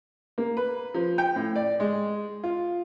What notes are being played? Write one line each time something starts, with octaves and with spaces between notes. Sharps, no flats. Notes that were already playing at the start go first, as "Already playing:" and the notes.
A#3
B4
F3
G5
A2
D5
G#3
F4